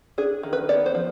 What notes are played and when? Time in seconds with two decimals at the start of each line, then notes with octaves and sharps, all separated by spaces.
0.18 D4 G#4
0.43 D#3
0.53 B4
0.69 B3 D5
0.86 C5
0.95 F3